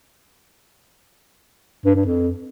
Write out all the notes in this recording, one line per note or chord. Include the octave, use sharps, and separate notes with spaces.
G2
G2
F2